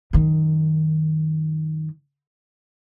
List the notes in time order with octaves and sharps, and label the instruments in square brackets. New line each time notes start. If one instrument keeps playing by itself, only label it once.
[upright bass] F#2 D#3